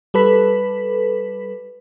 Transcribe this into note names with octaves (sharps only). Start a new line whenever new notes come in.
G3 A4 B4 B6